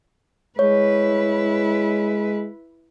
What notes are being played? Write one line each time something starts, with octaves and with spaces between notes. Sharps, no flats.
G#3 E4 B4 C#5